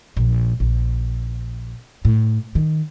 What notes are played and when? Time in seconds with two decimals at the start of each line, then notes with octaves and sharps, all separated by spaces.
0.17 A#1
0.60 A#1
2.05 A2
2.55 D#3